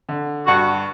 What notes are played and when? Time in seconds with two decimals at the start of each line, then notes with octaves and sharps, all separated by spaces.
0.09 D3
0.47 G2 F#4